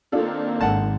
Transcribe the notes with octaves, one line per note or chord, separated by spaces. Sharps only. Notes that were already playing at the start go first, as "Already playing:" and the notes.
D#3 A#3 C4 D4 F4 A4
G#1 F#5 A5